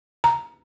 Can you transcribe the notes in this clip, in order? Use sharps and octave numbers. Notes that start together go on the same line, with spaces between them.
A#5